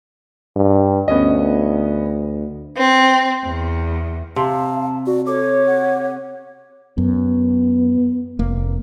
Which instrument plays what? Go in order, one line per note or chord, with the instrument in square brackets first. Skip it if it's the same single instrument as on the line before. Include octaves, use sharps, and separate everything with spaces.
[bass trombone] G2
[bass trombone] D2 [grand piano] B3 C#4 D#5
[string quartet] C4
E2
[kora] C3 [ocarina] F5 [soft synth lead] A5
[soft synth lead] F#4 [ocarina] D5
[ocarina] A4 [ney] C#5 [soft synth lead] D6
[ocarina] F#5
[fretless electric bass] F#2 [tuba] B3
[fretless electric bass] F1 A#3